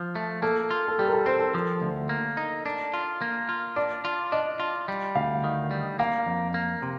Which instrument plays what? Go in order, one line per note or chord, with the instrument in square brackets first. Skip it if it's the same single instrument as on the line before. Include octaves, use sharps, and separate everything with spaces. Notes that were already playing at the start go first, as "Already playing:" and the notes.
Already playing: [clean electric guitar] F3
A3
[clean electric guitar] A#3 [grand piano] A4
[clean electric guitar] F4
[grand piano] A4
[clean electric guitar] G3 [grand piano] G4
[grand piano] A#4
A4
[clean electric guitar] C4 [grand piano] C5
[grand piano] A4
[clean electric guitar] F3
D2
A#3
D#4
D4
F4
A#3
F4
[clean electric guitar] D4 [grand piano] D5
[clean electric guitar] F4
[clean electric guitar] D4 [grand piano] D#5
[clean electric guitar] F4
G3
[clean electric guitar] D2 [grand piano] F5
[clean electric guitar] D#3
G3
[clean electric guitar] A#3 [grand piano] F5
[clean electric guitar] F2
A#3
C3